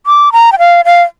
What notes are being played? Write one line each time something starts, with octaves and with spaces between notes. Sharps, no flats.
D6
A#5
G5
F5
F5